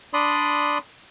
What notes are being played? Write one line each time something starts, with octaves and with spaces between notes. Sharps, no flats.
D4 D5 B5 C6 D#6